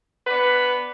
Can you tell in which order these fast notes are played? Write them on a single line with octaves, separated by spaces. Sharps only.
B4 D4 B3